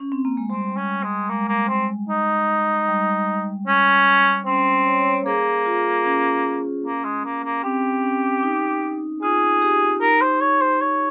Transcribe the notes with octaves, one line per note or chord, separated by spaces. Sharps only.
C#4
C4
A#3
G#3
G3 C4
C#4
G#3
G#3 A#3
A#3
C4
D#4
G3
C#4
C4 C#4
C#5
C#5
C5
A#3 G#4
F4
C#4
A#3
G#3
A#3
A#3
C4 G4
C#4
D#4
F4 G#4
G4
D#4 A#4
C5
C#5
C5
C#5